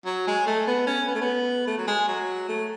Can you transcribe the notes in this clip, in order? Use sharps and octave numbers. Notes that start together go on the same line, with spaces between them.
F#3
G#3
A3
B3
C#4
B3
A3
B3
A3
F#3
G#3
F#3
A3